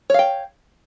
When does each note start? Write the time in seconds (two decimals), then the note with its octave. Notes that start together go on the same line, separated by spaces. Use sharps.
0.10 C#5
0.14 F5
0.19 G5